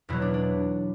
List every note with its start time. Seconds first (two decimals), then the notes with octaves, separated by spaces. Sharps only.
0.09 E2 B2 F#3 E4
0.22 D4
0.34 D4